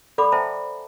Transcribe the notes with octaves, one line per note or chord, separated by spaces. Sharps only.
A4 D5 F#5 B5 D6
C5 E5 G5 A5 A#5